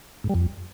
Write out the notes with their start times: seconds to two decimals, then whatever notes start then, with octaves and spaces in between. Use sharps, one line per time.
0.24 G#2
0.29 G3
0.35 F2